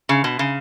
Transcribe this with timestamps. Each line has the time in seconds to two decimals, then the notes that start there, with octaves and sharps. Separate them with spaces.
0.09 C#3
0.24 B2
0.39 C#3